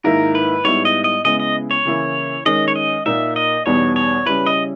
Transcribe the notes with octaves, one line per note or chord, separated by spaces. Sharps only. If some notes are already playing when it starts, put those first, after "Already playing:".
G#2 D#3 A#3 E4 A#4
B4
G#2 G3 B3 E4 C#5
D#5
D#5
C#3 G#3 B3 E4 D#5
D#5
C#5
C#3 E3 A#3 E4
D#3 G#3 C#4 D#5
C#5
D#5
A#2 A#3 D#4 E5
D#5
E2 B2 G3 B3 D#4 C#5
C#5
C#3 G3 C#4 E4 B4
D#5